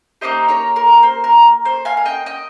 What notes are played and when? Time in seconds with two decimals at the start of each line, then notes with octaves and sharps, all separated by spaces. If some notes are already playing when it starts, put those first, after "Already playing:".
0.21 A#3 D#4 G4 C5 D#5
0.48 A#4 C#5
0.76 A#4
1.03 C5
1.24 A#4
1.65 C5
1.85 F5 G#5
1.97 F5
2.05 D#5 G5
2.26 D#5 G5